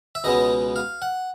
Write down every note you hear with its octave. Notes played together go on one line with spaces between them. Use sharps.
E5
C#2 B2 G#3 B3 D#5
F5
F#5